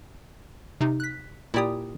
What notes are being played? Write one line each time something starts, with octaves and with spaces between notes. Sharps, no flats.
C3 D#4
F#6 B6
A#2 E4 G4 D5 D#6